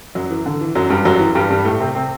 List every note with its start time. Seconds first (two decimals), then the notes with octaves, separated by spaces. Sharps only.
0.15 F#2 F#3
0.31 E3
0.46 D3
0.61 E3
0.75 F#2 F#3
0.90 G2 G3
1.05 F#2 F#3
1.20 E3
1.35 G2 G3
1.50 G2 G3
1.65 A2 A3
1.80 C3 C4
1.95 C3 C4